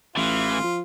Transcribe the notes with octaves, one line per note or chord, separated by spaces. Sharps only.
A1 E3 F4
F3